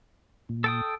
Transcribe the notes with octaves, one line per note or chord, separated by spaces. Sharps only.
A#2
A4 G5 D#6